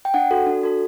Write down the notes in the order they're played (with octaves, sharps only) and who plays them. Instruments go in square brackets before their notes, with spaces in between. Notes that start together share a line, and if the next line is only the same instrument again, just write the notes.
[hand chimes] G5
D4 F#5
F#4 A4
D4
F#4 A4